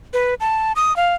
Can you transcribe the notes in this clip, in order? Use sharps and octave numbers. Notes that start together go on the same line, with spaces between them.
B4
A5
D#6
F5